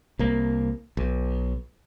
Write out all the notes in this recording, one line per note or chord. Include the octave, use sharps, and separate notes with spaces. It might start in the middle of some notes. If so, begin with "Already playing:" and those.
C2 A#3
B1